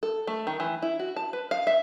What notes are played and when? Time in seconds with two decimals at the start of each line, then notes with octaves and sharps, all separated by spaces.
0.03 A4
0.27 A3
0.47 D#3
0.60 E3
0.82 E4
0.99 F#4
1.16 A5
1.33 B4
1.51 F5
1.67 E5